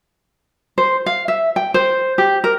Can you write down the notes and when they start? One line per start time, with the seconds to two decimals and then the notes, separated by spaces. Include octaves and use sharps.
0.78 C5
1.06 F5
1.28 E5
1.56 G5
1.74 C5
2.18 G4
2.44 A#4